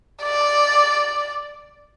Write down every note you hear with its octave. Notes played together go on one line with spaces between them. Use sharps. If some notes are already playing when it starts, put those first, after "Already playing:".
D5